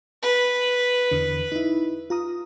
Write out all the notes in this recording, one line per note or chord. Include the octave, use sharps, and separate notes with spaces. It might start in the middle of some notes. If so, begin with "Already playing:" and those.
B4
E2 D3
D#4 E4
F4 A#5 D#6